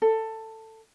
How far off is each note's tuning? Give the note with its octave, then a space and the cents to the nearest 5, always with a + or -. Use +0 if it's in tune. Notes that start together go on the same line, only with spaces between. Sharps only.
A4 +15